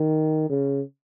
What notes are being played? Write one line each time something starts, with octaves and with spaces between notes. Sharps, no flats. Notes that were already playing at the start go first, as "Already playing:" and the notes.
Already playing: D#3
C#3